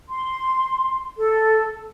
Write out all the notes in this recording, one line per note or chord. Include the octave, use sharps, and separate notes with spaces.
C6
A4